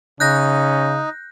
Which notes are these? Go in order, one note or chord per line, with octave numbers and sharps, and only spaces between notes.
C#3 C#4 D#4 F#6 G6 A#6